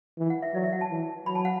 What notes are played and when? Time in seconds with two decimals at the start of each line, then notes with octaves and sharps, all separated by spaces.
0.18 E3
0.30 F#5
0.42 E5
0.54 F#3 D5
0.64 E5
0.73 F#5
0.81 A5
0.90 E3
1.26 F#3 B5
1.35 A5
1.45 F#5